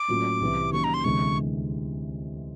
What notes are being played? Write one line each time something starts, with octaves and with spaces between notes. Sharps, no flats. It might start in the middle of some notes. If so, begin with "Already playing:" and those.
Already playing: D6
A2 F#3 A#3 C#4 F4
C2 C3 E3
D#3 F#3 A#3 C#4 F#4 C#6
A#5
C6
D2 C3 E3 G#3 B3 C#6